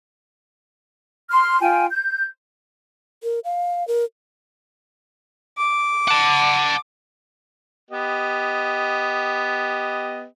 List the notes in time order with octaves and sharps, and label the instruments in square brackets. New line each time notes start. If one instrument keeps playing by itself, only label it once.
[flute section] C6 F6
F4 G5 G#5
G6
[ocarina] A#4
F5
A#4
[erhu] D6
[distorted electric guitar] F#5 A5
[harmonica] B3 G4 D#5